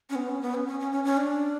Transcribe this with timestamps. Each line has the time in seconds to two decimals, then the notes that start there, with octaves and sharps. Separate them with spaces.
0.10 C#4
0.15 B3
0.28 C#4
0.42 B3
0.54 C#4
0.67 C#4
0.80 C#4
0.92 C#4
1.04 C#4
1.17 D4